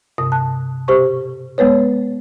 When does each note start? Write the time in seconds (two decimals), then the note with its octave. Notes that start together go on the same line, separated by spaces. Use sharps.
0.18 G2 C3 D#6
0.32 A5 F#6
0.88 B2 G4 C5 C#6
1.58 G#3 B3 B4 C#5